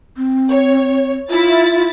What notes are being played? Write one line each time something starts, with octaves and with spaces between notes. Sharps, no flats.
C4
C#5
E4 F4 A6